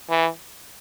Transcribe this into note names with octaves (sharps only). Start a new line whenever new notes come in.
E3